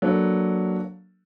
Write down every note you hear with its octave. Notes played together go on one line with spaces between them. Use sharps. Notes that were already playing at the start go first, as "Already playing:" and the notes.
F#3 A#3 D4 A4 B4